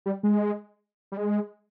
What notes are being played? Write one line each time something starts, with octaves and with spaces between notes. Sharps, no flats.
G3
G#3
G3
G#3